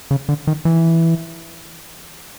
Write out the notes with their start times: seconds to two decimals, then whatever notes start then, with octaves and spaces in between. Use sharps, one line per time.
0.11 C#3
0.29 D3
0.47 D#3
0.65 E3